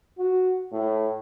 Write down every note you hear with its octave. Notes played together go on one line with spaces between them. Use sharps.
F#4
A2